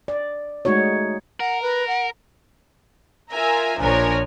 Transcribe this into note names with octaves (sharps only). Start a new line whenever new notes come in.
D5
G#3 A3 D#4 F#4 C#5
A#4 F#5
B4
F#5
F4 A#4 E5 G#5 A#5
A#1 F3 D4 A#4 C#5 G#5